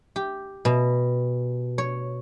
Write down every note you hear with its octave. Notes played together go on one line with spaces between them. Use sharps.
G4
B2
C#5